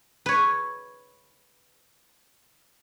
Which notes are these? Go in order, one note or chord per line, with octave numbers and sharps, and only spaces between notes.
B4 C#5